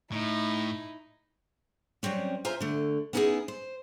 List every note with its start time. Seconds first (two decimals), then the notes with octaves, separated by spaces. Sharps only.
0.12 A2 D#4 E4
2.03 F#3 G3 C4 C#4
2.45 F4 C5 E5 G#5 A#5
2.60 D3 A3
3.13 B3 C#4 D#4 E4 G4 G#4
3.48 C5